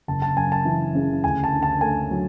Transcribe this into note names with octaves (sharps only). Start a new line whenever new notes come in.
F#1 A5
A5
F#2 G#5
A5
E3
C#3
D2 G#5
A5
D3
A5
A3 G#5
F#3